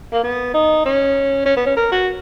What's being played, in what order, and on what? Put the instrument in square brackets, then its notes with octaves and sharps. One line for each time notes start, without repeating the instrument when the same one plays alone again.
[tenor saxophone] A#3
B3
D#4
C#4
C#4
B3
C#4
A#4
F#4